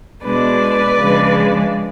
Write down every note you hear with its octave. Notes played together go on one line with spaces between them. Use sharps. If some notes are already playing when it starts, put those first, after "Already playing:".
B2 G#3 D4 B4 D5
C#3 F3 G#3 D4